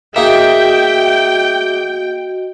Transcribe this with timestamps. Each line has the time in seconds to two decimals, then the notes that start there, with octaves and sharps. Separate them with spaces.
0.16 A#3 D#4 F#4 G#4 D#5 E5 G5